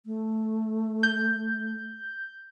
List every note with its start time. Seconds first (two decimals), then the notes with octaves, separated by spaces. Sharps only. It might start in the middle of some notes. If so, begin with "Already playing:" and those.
0.06 A3
1.03 G6